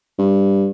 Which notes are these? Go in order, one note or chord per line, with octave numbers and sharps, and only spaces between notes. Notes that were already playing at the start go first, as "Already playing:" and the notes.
G2